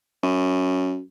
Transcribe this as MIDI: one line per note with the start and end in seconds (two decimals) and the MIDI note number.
0.23 1.00 42